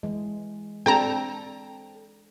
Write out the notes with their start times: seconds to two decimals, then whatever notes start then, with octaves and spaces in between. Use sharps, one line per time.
0.03 E3 G#3
0.86 C4 D4 A4 G5 A5 A#5